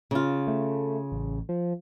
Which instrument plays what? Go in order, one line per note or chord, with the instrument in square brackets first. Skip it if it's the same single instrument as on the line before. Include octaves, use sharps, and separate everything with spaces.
[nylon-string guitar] C#3 F4
[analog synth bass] A3
A1
F3